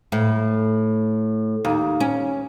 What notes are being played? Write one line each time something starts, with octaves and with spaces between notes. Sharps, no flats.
A2
D#2
C#4